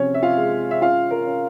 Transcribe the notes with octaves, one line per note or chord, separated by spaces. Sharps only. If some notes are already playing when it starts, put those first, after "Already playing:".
Already playing: C3 F3 C#4 C#5
E5
F4 F5
G#3
E5
C#4 F4 F5
A#4
C#4